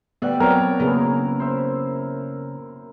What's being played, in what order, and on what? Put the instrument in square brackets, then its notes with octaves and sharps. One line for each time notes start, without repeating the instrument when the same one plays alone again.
[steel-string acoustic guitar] D2 G3 D5 [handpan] B3 [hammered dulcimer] E5 F#5 G5
[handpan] F#3 B3 C4 [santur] A#4 [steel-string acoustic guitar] C#5 D5
[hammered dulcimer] F#2 E4 [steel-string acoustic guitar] C#3 [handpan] A#3 B3 G#4
[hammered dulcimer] C5 E5